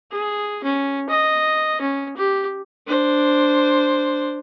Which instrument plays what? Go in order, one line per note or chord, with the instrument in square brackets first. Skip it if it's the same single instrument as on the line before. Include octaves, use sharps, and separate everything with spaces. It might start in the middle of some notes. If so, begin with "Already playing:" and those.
[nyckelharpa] G#4
C#4
D#5
C#4
G4
[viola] D4 C5